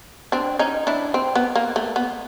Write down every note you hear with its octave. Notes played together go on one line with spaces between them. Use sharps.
C4 D4
C#4 D#4
D4 E4
C4
B3
A#3
A3
B3